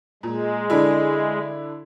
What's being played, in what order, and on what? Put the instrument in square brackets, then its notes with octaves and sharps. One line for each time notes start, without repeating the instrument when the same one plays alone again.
[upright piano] A#2 [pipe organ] G#3
[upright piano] D3 D4 E4